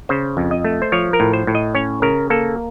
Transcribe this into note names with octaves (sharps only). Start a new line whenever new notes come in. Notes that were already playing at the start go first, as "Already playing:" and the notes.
C#3 C5
F2
D#5
A3
C5
F3 C#5
A#4
A2
C5
A2
D#5
C#4 C#5
C#3 A#4
A#3 A4